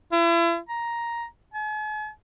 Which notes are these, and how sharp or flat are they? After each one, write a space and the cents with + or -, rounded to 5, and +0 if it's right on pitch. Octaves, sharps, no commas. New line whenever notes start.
E4 +40
A#5 +5
G#5 +45